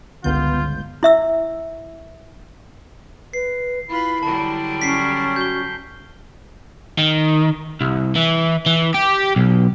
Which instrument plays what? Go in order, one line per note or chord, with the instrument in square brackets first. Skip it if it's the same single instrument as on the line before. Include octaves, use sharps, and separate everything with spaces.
[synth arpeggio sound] G1 C#2 G6 [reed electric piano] D3 [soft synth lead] B3 [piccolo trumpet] F4
[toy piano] E4 E5 E6
[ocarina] B4 [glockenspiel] C7
[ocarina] E4 [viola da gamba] F4 B4 [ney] B5
[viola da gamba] D3 F#3 G3 [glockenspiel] A5
[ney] C#4 [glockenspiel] B6 C7
[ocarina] F#4 [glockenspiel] G6 G7
[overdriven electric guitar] D#3
C2
E3
E3
G4
B1